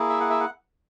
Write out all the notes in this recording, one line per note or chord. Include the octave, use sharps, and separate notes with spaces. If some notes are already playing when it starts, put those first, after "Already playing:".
Already playing: A#3 E4 G#4
E5
F#5
E5
F#5